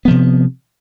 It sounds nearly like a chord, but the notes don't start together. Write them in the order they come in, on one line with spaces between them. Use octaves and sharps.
B3 F3 C3